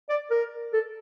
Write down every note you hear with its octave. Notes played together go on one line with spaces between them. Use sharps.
D5
A#4
A4